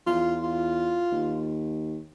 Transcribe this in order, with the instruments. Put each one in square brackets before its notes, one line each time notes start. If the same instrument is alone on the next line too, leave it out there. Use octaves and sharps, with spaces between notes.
[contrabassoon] E2 [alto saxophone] F4
[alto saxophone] F4
[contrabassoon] D#2